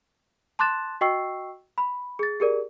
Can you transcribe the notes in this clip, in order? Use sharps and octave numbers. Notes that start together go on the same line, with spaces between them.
A5 C6 D6 F#6 A6 E7
F#4 D#5 G5 C#6 E6 C7
B5
G#4 A6
G4 G#4 A#4 D5